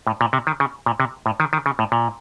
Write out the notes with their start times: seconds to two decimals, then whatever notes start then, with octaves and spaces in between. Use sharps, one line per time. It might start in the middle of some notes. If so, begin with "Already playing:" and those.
0.07 A2
0.21 A#2
0.33 C3
0.47 D#3
0.60 C#3
0.86 A#2
1.00 C3
1.26 A2
1.40 D#3
1.53 D#3
1.66 C#3
1.79 A2
1.92 A#2